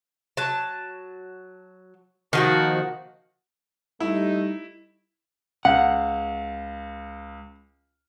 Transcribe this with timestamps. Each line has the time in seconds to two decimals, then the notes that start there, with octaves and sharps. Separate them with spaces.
0.37 F#3 A5
2.33 D#3 F3 A#3 F#4
4.00 G3 A3 D#4 E4
5.65 C#2 F5 F#5